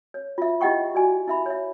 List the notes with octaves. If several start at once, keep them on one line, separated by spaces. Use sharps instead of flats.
C#5
F4 E5
E4 G4 D#5 F#5 G5 C#6
F#4 D5 G#5
E4 E5 B5
C#5 E5